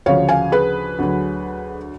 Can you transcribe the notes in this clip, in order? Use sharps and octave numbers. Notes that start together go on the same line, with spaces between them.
D2 C#3 F3 C#5 F5
F5 G#5
G#4 B4
D2 D3 F#3